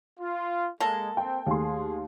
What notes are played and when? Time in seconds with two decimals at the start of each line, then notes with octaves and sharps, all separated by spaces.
0.20 F4
0.80 G#3 A#3 A4
1.17 C4 G5
1.46 D#2 A3 G#4 C6